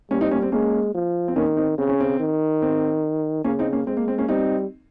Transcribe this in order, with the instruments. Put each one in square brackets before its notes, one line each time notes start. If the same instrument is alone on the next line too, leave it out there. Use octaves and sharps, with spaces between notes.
[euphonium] G3 [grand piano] A#3 C#4
[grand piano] C4 D#4
A#3 C#4
C4
[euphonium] G#3 [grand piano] A#3 C#4
[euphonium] F3
[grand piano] C4
[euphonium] D#3 [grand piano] A#3 C#4
[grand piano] C4 D#4
[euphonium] C#3 [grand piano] C4
[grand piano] C#4
C4
[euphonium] D#3
[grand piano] C4
[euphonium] C#3 [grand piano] A#3 C#4
[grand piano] C4 D#4
A#3 C#4
[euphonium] G#3 [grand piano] C4
[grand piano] A#3
C4
A#3 C#4
[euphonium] G3 [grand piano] C4 D#4